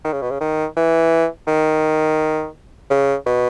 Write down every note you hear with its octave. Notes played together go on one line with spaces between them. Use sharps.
D#3
C#3
B2
C#3
D#3
E3
D#3
C#3
B2